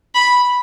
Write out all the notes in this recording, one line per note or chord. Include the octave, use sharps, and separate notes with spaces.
B5